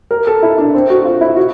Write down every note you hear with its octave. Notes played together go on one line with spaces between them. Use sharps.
A#4
A4
E4
D4
C4
F#4
F4
E4
F#4